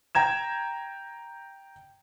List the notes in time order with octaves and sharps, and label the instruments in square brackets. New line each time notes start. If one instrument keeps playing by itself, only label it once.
[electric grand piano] G5 A#5 G#6 E7